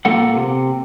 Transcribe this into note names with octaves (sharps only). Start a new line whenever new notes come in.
A#2 A#3 A4 F#5
C3